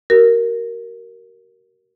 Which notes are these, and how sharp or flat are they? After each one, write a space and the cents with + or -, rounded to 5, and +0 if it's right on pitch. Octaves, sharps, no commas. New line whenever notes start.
F#4 +40 A#4 +0